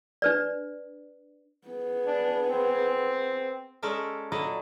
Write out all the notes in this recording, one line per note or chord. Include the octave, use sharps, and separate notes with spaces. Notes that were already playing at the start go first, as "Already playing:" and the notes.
D4 B4 D5
B3 G#4
D4
C4
G#3 C#4 A4 A#4 D5 E5
A#2 F#3 E4 A4 D5 D#5